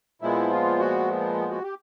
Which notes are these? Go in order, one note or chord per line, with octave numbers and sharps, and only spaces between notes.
A#2 F3 G#3 B3 E4
F4
F#4
F#4
G4